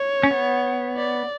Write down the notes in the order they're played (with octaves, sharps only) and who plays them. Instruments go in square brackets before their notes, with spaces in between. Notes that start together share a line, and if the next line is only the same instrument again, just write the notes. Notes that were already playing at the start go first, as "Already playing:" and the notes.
Already playing: [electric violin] C#5
[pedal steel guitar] C#4
B3
[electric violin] D5